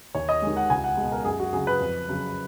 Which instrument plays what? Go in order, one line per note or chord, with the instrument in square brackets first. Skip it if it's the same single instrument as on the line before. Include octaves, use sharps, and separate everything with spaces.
[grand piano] D#2 C#5
D#5
D#3 G#3
F#5
C#2 G#5
F#5
G#3
B2
A#4
F#2 G#4
F#4
C#3 F#3 G#4
B4
F2
C#3 F#3